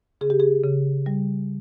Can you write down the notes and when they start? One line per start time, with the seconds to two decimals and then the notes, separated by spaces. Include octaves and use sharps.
0.21 C#3 G#4
0.30 G4
0.40 G#4
0.64 C#3
1.06 G3